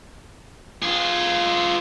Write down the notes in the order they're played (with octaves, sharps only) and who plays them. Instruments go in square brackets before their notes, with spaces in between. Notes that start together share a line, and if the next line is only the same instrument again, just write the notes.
[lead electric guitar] F4 G#4